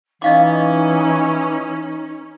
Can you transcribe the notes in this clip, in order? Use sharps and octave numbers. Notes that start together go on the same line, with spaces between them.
E3 C#4 D#4 D#5 F5 D6